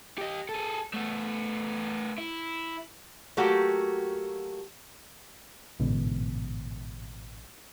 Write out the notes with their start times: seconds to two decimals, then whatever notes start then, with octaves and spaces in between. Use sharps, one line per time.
0.18 G4 D#5
0.49 G#4 A4
0.94 A3 B3
2.18 E4
3.37 F#3 A3 A#3 F#4 G4
5.80 A1 G#2 B2 D3